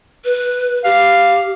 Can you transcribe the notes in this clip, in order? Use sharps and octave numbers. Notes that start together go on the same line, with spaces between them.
B4
G4 F5